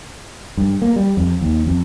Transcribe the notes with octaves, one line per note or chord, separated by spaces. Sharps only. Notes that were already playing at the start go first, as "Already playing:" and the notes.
G2
A#3
G3
F2
D#2
F2